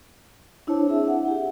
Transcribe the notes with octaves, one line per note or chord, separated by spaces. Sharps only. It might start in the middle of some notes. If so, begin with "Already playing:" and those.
D4 E4 C5 C#5 A5
C4 G#4 E5
F#5
E4 G4